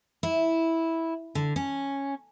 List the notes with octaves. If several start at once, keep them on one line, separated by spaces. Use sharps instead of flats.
E4
D3
C#4